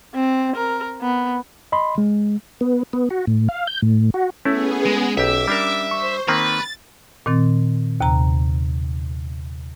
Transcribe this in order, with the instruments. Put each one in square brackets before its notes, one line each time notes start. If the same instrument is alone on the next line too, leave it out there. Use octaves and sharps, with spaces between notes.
[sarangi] C4
A#4
B3
[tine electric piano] D#5 B5 C6
G#3
[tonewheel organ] B3
B3
F#4
A2
F5
G6
A2
F#4
[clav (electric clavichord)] A3 E4 [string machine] B3 G#4 [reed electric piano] C#4
[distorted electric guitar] G#3
[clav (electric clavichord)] B1 G4 [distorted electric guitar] E5 [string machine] D6
[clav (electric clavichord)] G3 D4 A#4
[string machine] C5 [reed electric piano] C#6
[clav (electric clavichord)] D#3 A#3 C4 [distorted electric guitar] B4 [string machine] A6
[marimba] A#2 D#3 C4 A6
D#2 C3 A#5